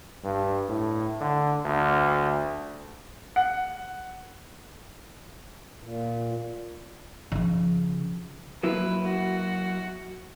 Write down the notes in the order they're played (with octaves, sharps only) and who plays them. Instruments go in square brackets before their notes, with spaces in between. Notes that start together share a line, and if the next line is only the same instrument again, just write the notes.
[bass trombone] G2
A2
D3
D2
[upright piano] F#5
[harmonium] A#2
[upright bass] C#3 F3
[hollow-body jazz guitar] F#3 A#3 E4 [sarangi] B4
[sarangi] F#4